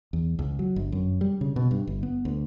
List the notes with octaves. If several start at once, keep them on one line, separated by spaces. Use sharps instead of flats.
E2
C#2
F#3
G1
F#2
G3
C#3
B2
G2
G1
B3
D2